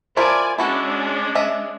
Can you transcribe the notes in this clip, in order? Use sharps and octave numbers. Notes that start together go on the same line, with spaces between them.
F3 E4 A#4 D5 G#5
G#3 C#4 D4 E4 F#4 A4
D#5 E5